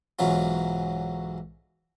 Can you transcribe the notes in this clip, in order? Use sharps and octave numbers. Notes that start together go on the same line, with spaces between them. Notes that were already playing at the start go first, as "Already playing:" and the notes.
B1 G#2 E3 F#3 C#4 F4